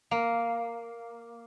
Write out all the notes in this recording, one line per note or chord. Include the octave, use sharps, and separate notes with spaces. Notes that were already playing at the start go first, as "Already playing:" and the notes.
A#3